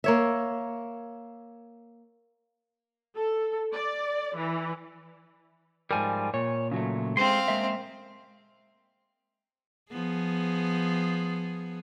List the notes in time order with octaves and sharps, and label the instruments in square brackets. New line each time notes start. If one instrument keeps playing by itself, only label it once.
[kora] A#3 C#5 E5
[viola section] A4
D5
E3
[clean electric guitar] G#2 F3 G3 [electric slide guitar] A#4 G#5
[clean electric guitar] A#2 [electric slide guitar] C#5
[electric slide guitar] C#3 F#3 A3
[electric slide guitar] G#3 A3 [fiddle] C4 F5 [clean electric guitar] C6
[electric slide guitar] G#3 A#3 E5
[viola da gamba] F3 B3 G#4